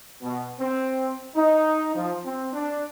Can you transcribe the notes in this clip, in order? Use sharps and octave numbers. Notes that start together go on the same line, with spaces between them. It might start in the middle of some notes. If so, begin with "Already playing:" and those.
B2
C4
D#4
F3
C4
D4